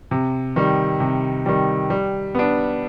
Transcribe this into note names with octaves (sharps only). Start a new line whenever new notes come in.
C3
D#3 G3
C3
D#3 G3
G3
B3 D4